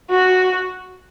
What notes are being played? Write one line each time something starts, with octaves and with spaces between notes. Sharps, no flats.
F#4